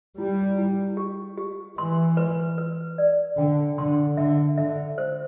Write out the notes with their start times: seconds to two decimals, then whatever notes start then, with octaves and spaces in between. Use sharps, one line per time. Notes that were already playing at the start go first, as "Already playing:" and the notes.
0.17 G3 E4
0.58 E4
0.97 G4
1.37 G4
1.78 E3 C6
2.17 B4
2.58 B4
2.98 D5
3.37 D3 G5
3.77 D3 C6
4.17 D3 E5
4.58 D3 E5
4.98 C5